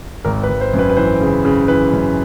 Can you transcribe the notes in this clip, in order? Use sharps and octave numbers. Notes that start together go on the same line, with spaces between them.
G#1 A#4
B4
G#1
C5
F#2
B4
B4
E3 C5
C#3
C#3
E3 B4
F#2